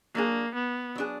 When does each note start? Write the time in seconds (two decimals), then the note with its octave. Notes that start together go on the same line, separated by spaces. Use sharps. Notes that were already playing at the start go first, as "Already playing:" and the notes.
0.15 F#3 A#3 D4 G#4
0.55 B3
0.96 F#3 D4 G#4